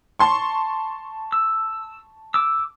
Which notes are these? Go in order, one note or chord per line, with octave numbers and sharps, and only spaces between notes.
A5 C6 C#6
E6
D6 E6